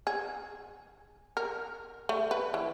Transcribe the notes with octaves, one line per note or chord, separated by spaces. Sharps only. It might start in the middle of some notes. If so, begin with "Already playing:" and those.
G#4
A#4
A3
B4
E3